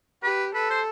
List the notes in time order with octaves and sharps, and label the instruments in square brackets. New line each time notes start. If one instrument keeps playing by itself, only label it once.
[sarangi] G4 [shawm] B4
[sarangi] A4 [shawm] B4
[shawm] C5